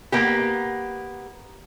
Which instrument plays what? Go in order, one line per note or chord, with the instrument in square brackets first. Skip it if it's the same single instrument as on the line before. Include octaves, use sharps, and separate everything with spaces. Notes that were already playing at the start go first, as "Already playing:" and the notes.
[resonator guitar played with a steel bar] A#3 B3 G4